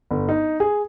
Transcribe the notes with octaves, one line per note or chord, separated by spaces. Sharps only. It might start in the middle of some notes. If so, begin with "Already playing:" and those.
G1
D#4
G#4